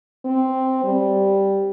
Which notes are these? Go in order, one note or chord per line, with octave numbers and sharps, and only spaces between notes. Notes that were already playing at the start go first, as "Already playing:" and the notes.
C4
G3